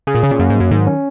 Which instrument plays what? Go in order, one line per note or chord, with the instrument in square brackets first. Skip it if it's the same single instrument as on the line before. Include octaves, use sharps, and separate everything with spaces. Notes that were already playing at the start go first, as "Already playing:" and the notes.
[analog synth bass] C#3 [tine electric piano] G#4
[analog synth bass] A#2
[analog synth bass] C#3 [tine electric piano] C#4
[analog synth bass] A#2
[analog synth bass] F#2 [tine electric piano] A#3
[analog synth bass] G#2 [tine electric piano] F#3
[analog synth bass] F#2
[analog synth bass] G#2 [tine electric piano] D#3
[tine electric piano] C#4